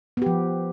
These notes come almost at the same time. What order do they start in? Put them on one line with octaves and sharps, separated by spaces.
B3 G4 F3